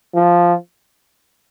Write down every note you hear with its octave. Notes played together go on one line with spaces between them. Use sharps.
F3